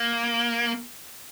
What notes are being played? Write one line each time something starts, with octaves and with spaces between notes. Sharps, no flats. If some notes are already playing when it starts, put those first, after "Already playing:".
Already playing: A#3